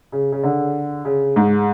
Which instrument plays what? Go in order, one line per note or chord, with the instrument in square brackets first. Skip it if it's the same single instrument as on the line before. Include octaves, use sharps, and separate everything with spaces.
[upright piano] C#3
C#3
D3
C#3
G#2